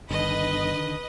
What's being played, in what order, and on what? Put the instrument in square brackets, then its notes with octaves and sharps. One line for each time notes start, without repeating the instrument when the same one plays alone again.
[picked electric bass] G1 [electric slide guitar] D3 D#3 [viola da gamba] B4 [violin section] D#5